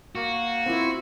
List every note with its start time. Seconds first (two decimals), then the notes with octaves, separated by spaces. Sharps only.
0.15 A#3 F#4
0.66 C4 E4 F4